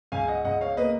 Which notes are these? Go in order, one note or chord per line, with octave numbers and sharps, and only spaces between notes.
C#2 F5 G#5
D#5 F#5
C#2 D#5 F#5
C#5 F5
A#3 B4 D#5